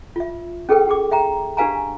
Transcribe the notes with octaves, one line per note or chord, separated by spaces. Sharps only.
F4 E5
C#4 G#4 A4 B4 G5
G4 G#4 D6
E5 G5 A#5
D4 G4 B4 F5 G#5 A#5